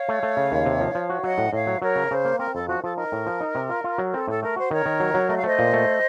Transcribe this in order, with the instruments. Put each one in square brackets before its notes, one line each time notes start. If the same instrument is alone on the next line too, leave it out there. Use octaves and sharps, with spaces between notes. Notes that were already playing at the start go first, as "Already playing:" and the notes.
Already playing: [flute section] C#5 F5
[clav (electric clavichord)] A3
A3
C#3
D#2
C3
F3
F3
F#4
[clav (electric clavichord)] F#3 [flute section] D#5 F#5
[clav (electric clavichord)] A2
[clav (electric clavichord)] A2 [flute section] C#5 F5
[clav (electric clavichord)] F#3
[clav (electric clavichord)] F#3 [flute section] A#4 C#5
[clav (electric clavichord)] C#3
[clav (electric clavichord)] C#3 [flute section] C5
[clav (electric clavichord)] A#3
[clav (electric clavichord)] C4 [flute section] A#4
[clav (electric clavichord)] F2 [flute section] A4
[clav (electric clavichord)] F3 [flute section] F#4
[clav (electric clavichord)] F3 [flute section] A4
[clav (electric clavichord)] D#4 [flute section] A#4
[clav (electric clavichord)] A2
F3
D#4
C3
F4
F4
F#3
[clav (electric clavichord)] C4 [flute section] A4
[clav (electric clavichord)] A2 [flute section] A4
[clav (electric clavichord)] A3 [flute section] A#4
[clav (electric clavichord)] F#4 [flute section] C5
[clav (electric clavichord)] D#3 [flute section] A#4 C#5
[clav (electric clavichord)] D#3
F#3
F#3
[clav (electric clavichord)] A3 [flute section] D#5
[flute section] F5
[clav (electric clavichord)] A3 [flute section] C5 D#5
[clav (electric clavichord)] A#2
A3